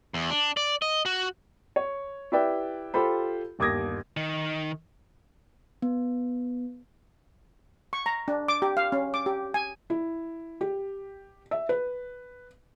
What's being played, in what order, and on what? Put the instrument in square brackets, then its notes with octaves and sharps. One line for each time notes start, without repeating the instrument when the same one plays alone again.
[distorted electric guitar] E2
D4
D5
D#5
F#4
[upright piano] C#5
E4 G4 B4 D5 E5 G5
F4 G4 A4 C5 B5
G1 D#2 D6 D#6 G#6 A#6
[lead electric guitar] D#3
[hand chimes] B3
[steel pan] C#6
A#5
D4
D6
G4
F5
C#4
D6
G4
G#5
[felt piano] E4
G4
E5
B4